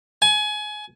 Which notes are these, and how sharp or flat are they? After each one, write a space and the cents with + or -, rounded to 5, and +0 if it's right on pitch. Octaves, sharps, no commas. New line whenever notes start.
G#5 +25